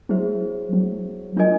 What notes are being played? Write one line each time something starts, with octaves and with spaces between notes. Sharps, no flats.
F#3 E4 G#4 C5 E5
F#3
F#3 D4 F4 A#4 D#5 G#5